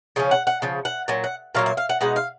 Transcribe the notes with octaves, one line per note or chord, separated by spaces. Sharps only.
C#3 F3 C#4
F#5
F#5
C#3 F3
F#5
A#2 F#3
F#5
A#2 F#3 A#3 F5
F5
F5
F#5
B2 G#3 D#4 F#5
F5